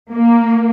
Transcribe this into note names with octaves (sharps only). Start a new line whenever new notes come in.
A#3